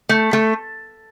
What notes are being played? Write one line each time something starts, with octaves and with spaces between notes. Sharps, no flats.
A3
A3